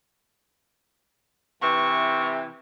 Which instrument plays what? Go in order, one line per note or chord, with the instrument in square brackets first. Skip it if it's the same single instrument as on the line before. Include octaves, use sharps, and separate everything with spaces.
[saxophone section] C3 E3 [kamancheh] C#6